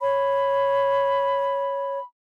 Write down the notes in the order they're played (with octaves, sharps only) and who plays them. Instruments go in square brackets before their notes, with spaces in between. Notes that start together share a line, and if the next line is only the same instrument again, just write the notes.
[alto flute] C#5 [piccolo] B5